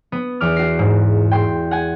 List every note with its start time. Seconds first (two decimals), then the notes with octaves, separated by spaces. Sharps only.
0.12 B3
0.40 E2 D6 F6
0.57 F#4 C7
0.79 G#2
1.31 G5 C6
1.71 F#5 G#5